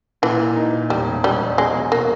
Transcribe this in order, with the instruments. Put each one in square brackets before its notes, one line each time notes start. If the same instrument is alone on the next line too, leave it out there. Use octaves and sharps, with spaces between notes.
[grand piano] A#2 [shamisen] E3
[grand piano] A#3
D#4
A#2
[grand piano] E1 [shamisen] G3
[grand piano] E1
[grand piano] B2 [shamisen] G3
[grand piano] E1
[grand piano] B1 [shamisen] G#3
[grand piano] B2
[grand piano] B2 [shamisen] A#3